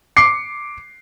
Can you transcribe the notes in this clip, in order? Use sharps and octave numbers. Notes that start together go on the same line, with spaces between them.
D6 C7 C#7